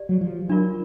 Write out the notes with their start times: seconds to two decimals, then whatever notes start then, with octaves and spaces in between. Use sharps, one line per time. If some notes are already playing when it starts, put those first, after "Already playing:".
Already playing: G4 D5
0.09 F#3
0.21 F3
0.49 F#3 D4 F4 A#4